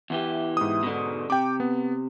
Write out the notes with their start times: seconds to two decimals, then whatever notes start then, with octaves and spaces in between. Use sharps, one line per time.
0.10 E2 E3 G4
0.57 G#2 D#6
0.83 B2 D3
1.30 C3 G5 D6
1.60 B3